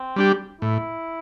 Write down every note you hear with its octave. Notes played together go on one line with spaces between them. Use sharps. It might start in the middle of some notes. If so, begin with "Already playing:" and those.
Already playing: C4
G3 D4 G4
A2 E4